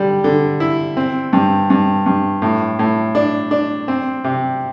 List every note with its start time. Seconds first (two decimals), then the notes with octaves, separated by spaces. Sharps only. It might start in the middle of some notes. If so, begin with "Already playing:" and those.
Already playing: D3 G3
0.24 D3
0.60 E4
0.97 C4
1.33 G2
1.70 G2
2.06 G2
2.42 A2
2.79 A2
3.15 D4
3.51 D4
3.88 C4
4.24 C3